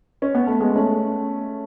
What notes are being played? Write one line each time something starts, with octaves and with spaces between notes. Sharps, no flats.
C#4
B3
A3
G#3 B3
A3 C#4